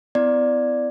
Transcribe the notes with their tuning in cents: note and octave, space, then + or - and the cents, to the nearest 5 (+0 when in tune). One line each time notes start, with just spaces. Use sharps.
B3 +40 E4 +10 D5 +0